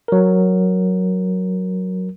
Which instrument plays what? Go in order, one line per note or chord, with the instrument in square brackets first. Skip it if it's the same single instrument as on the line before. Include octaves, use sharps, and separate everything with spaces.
[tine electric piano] F#3 A#4